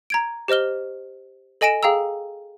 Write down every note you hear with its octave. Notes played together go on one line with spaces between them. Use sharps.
A#5 G#6 D7
G4 C5 D#5 F6 G7
A4 D#5 G#5 A#6 D7 E7
G#4 F5 G5 A#5 E6